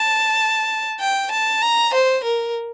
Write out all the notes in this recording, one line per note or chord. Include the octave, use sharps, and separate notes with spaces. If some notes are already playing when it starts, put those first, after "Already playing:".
Already playing: A5
G5
A5
A#5
C5
A#4